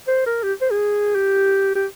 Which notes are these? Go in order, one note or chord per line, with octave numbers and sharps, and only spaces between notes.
C5
A#4
G4
C5
G#4
G4
G4